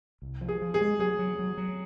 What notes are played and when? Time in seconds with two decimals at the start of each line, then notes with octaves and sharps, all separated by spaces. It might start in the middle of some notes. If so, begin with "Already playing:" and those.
0.22 C2
0.41 F3
0.49 G#4
0.62 F3
0.74 G#4
0.81 G#3
0.99 F#3 G#4
1.19 F#3
1.39 F#3
1.57 F#3